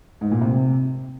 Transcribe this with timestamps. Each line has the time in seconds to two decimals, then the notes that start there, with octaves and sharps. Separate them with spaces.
0.21 G#2
0.31 A#2
0.41 C3